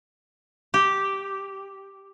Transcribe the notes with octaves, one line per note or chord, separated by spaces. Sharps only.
G4